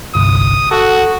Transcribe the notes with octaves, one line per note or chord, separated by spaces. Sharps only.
G1 C2 D#6
F#4 A4 F#5